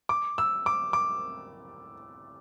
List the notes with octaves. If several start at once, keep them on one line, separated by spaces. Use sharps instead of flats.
D6
E6
D6
D6